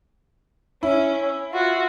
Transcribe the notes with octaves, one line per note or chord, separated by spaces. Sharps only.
C#4 E4
F4 F#4